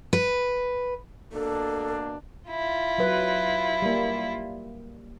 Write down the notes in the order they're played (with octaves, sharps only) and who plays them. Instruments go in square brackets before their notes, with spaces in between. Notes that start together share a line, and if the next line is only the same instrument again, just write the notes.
[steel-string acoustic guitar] B4
[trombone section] B2 A#3 D4 [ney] A4
[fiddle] E4 F4
[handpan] F#3 B4
G3 A#3